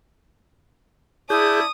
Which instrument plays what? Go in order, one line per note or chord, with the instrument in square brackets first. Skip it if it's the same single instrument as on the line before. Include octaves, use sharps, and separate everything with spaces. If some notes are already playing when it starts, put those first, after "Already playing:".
[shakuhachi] E4 [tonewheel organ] G#4 G6 [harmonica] D5 A5 [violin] D#6